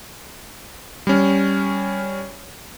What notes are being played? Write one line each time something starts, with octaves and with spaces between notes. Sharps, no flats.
G3 C#4